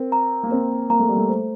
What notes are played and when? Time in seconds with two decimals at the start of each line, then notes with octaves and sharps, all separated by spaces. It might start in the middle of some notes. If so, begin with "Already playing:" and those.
Already playing: C4 A#4
0.12 A#5
0.43 A#3
0.51 C4 A#4
0.90 A#3 A#5
1.00 A3
1.09 G3
1.17 A3
1.29 C5